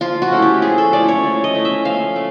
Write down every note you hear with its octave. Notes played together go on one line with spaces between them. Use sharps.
F3 F4
F#4
A3 C#4 E4
G4
F3 G#4
A4
A3 C#4 E4 D5
C#5
F3
D#5
A3 C#4 E4
E5
F3 F5
A3